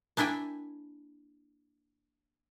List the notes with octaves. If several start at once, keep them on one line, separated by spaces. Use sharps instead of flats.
A#3 D4 E4 G5 G#5